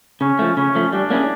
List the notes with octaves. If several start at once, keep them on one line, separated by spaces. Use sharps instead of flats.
C#3 C#4
F3 A3
C#3 C#4
F3 A3
G3 D4
A#3 C#4 E4 G#4